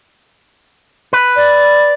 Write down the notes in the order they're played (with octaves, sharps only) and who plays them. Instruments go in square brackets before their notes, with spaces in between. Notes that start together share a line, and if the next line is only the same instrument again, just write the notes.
[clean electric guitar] B4
[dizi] D5